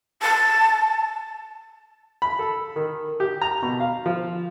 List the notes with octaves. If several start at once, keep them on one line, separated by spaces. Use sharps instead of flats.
A5
B5
A4
D#3
G4
A#5
B2
F5
F3